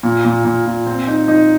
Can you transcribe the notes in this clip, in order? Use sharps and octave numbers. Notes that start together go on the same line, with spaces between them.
A#2
A#2
A#2
A#2
C4
D#4
D#4